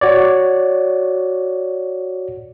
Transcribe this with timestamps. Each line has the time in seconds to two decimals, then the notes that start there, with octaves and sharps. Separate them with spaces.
0.01 F#4 C#5 D5